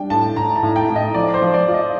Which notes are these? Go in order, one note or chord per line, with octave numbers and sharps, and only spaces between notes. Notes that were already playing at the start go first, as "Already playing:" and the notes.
Already playing: G3 D4 G5
A2 A5
A2 A#5
A5
A2
G5
A2
D#5
F3 D5
C5
F3
D5
F4
D#5